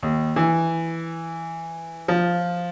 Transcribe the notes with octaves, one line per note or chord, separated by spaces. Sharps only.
D#2
E3
F3